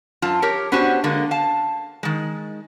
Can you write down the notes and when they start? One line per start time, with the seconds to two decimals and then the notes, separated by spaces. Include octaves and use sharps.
0.22 F#2 F4 A5
0.42 G4 A#4 C#5
0.72 B3 C#4 D4 F#4 G4 C5
1.04 D3 G#3 A#3
1.31 F5 A5
2.03 D#3 G#3